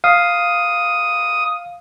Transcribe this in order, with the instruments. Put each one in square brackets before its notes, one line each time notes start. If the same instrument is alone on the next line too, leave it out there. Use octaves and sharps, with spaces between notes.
[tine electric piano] F5 [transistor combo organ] D#6